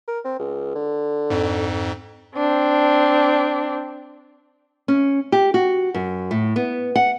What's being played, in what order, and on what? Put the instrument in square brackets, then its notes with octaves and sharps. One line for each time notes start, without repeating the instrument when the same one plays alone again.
[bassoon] A#4
C4
C#2
D3
[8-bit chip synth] F2 G#2
[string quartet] C4 D4
[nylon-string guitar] C#4
G4
F#4
F#2
A2
B3
F#5